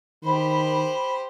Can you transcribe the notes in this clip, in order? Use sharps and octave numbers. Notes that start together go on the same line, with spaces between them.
D#3 G4 C5 B5